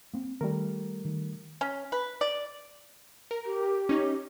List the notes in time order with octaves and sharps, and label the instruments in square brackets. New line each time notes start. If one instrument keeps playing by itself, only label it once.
[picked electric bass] A#3 C4
[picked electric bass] D#3 [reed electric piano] G3 A3 A#4
[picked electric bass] D#3
[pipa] C#4
B4
D5
[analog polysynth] A#4
[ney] G4
[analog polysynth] C#4 D#4